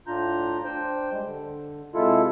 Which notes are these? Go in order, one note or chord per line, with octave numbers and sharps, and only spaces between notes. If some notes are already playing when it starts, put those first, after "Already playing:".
A2 D4 F4 A#5 G6
D4 C5 G5
G3 G#3
D3
C3 G#3 E4 F4 A4